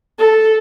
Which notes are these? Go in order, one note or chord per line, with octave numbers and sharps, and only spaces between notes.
A4